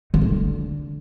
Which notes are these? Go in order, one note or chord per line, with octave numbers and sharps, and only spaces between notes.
D#3
D3